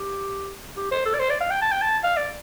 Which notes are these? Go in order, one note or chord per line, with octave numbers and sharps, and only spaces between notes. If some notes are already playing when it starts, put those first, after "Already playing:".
Already playing: G4
G4
C5
A4
D5
C5
D5
F5
G5
A5
G5
A5
F5
D5